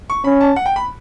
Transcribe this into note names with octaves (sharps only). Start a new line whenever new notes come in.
C#6
C#4 B5
A5
F#5
G5
B5